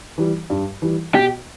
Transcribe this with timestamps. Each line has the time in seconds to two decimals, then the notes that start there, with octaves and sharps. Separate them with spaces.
0.18 E3 G3
0.50 G2
0.82 E3 G3
1.15 B2 G4